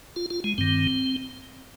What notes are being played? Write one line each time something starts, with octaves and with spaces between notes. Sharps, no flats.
F4
F4
G#3
G2 D#3 C4